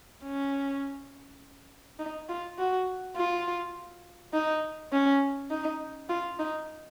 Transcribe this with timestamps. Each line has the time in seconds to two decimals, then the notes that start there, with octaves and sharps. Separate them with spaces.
0.23 C#4
1.99 D#4
2.29 F4
2.58 F#4
3.16 F4
4.33 D#4
4.92 C#4
5.51 D#4
6.09 F4
6.39 D#4